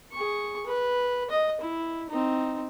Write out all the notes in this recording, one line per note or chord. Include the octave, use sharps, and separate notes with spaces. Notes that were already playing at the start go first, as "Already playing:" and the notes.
G#4 C#6
B4
D#5
E4
C4 D#4